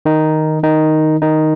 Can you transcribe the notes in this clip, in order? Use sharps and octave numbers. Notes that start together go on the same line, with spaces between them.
D#3 D#4
D#3 D#4
D#3 D#4